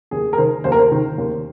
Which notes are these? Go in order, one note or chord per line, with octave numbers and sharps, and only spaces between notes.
D#2 G#4
A#4
D#3 C5
D#2 C5
A#4
C5
D#3
D#2